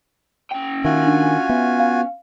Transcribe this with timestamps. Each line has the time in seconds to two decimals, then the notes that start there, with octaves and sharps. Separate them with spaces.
0.52 C#4 G5
0.84 D#3 F4 F#4 E5 G#5
1.06 D4
1.49 B3 E5
1.80 F5